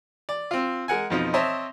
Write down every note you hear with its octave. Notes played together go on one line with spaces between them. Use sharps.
D5
C4 F4
G#3 A#4 F#5 G#5
F2 B2 F3 D#4
C4 C5 C#5 D#5 E5 A5